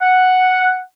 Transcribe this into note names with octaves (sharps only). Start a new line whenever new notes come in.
F#5